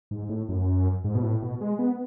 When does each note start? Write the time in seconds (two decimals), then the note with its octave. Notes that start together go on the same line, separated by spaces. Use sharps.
0.11 G#2
0.29 A2
0.49 F#2
1.04 G#2
1.15 B2
1.23 A2
1.42 B2
1.61 G#3
1.79 B3